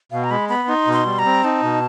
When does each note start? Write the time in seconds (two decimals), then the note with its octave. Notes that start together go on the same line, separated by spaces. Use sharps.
0.12 B2 F5
0.24 A#5
0.31 G#3 B5
0.49 B3 B5
0.68 D#4 C6
0.87 B2
0.93 C6
1.06 G3
1.19 A#5
1.26 C4
1.44 D#4 A5
1.63 B2